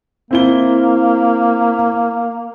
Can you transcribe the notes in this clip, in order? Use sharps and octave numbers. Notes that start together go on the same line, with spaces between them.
A#3 C4 E4 G7